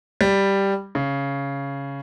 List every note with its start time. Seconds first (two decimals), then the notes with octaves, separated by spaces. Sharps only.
0.21 G3
0.95 C#3